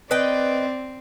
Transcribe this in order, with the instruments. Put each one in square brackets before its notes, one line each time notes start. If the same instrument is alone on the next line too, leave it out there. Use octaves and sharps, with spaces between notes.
[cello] C4 [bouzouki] B4 D#5 G5 [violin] D5